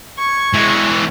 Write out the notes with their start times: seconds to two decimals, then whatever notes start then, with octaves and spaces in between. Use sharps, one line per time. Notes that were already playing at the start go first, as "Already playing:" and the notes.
0.18 C#6 G#6
0.53 E3 G#3